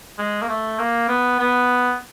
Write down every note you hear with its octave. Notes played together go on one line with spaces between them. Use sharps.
G#3
A#3
A3
A#3
B3
B3